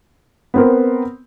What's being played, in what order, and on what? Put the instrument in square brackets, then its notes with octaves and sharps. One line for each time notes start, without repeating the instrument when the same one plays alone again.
[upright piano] B3 C4 A#4